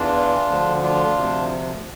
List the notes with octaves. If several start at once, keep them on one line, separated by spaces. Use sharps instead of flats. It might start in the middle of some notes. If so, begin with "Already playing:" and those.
Already playing: E2 E3 D4 F4
D2 D3 F3
D4 F4
D2 C3 F3